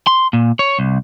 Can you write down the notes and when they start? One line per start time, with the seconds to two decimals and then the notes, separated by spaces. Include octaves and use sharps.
0.07 C6
0.33 A#2
0.59 C#5
0.79 C2